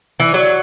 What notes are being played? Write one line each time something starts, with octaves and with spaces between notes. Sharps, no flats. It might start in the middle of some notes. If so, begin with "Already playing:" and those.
E3
F#3